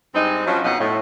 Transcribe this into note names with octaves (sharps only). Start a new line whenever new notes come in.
G2 G#3 C4 D#4
F3 F#3 C#4
F2 B2 B3 D#4 F5 F#5
A2